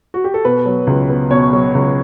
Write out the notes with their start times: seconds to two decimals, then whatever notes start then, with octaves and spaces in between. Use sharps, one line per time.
0.14 F#4
0.24 G4
0.34 A4
0.45 B2 B4
0.65 F#3
0.87 C#2
1.10 B3
1.31 B2 C#5
1.53 F#3
1.75 C#2